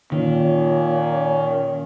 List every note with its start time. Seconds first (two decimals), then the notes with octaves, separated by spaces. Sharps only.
0.12 A#2 D#3 C#4